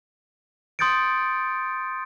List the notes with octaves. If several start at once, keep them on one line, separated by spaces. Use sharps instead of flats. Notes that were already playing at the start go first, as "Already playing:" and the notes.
C6 D#6 G6 A6 C#7 D7